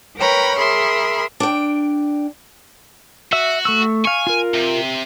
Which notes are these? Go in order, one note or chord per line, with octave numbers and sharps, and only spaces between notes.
A#4 B4 C#5 G5 A#5 B5
G#4 A#4 E5 B5 C6
D4 G5
F#4 E5 E6
A3 C#6 E6
F5 G#5 C#6
F4 A#4
C3